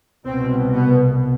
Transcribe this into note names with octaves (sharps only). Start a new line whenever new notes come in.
C2 B2 C4
B3